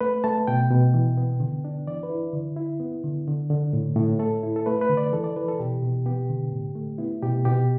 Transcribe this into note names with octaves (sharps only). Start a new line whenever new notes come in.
A3 B4
A3 A5
B2 G5
B2
E3
B3
D3
D4
E3 D5
B4
E4
D3
E4
B3
D3
D3
D3
A2
A2
A3 A4
E4
A4
A3 B4
B4
D3
D5
E3 A4
D5
E3 B4
A4
B2 G4
B2
B3 G4
D3
A2
A3
B3 E4
B2 G4
B2 G4